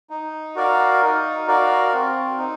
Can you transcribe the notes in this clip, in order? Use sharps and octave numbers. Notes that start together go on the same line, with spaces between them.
D#4
F#4 A#4 D5 F5
D#4
F#4 A#4 D5 F5
C4
D#4